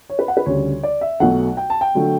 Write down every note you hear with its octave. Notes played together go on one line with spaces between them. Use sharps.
C#5
B4
F#5
B4
D2 C#3 G3 C#5
D5
E5
B1 B2 F#3 A3 F#5
G5
A5
G5
D3 F#3 A3